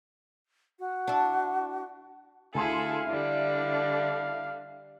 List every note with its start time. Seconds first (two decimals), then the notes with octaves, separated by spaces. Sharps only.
0.79 F#4
1.08 D4 E4
2.55 D2 E4 G#4 A4 F5 G#5 C6
3.07 D3 G3 D4 E4